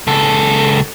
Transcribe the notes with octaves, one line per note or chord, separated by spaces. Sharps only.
C#2 A4